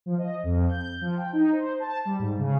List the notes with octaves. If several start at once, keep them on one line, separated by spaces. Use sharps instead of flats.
F3
D#5
F2
G6
F3
G5
D#4
C5
A5
G3
G#2
C#3